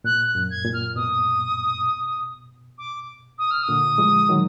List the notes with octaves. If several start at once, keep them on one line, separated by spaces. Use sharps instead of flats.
A#2 F#6
F#6
F#2
G#6
A#2
F6
B2 D#6
D6
D#6
F6
D#6
A#2 D3
F3 G#3
D#3 F#3